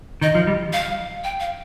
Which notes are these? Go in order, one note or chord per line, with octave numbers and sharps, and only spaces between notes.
D#3 D#5
F3
G3
F5
G5
F5